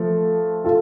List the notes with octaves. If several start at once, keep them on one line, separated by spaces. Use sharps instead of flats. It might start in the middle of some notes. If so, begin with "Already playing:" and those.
Already playing: F3 A3
F4 A4